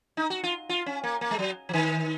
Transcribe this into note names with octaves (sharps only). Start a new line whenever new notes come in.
D#4
F#4
F4
F4
C#4
A#3
A#3
G#3
F#3
F3
D#3